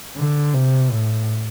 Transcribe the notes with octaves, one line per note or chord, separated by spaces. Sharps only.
D3
C3
A2